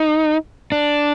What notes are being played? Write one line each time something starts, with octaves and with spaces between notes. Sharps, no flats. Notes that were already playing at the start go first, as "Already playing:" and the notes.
Already playing: D#4
D4